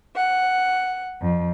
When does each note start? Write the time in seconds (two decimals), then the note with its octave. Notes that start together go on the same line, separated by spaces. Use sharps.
0.17 F#5
1.21 F2